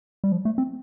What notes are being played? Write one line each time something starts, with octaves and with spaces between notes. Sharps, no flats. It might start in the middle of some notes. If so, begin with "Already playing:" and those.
G3
F3
A3
C4